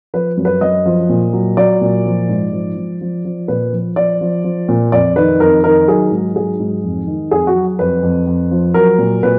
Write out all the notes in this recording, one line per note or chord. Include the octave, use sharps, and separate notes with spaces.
F3 B4
F#2
B4
F#2 D#5
F3
A#2
F#3
F#3 D5
A#2
F3
G#2
F3
F3
F3
F3
A#2 B4
F3
F3 D5
F3
F3
A#2
F2 D5
D#3 B4
F2 A#4
D#3 A#4
F#3 G#4
G#2
F#3 G#4
G#2
F2
D#3
F2 G#4
F#4
F#3
F2 B4
F2
F2
F3
F#3 A#4
A#2
A#2 B4